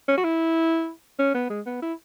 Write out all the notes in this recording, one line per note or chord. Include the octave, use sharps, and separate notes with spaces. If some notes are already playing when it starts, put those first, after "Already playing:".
C#4
F#4
E4
C#4
B3
G#3
B3
E4